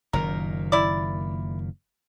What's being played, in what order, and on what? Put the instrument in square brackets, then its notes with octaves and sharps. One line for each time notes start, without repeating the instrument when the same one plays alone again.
[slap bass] F#1 A#2 D#3 [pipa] A#4
[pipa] E4 D5